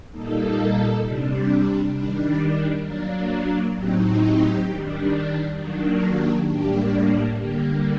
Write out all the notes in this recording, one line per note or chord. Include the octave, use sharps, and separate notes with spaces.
A#2 G3 A#3 D#4 A4
C3 G3 D4
D#3 G3 D4
F#3 A#3 D4 A#4
A#4
A2 F#3 C4 D#4 G4
G4
D#3 G3 D4
D#3 F#3 A#3 D4
G4
G4
A2 G3 A#3 D4 G4
D3 G3 A#3 G4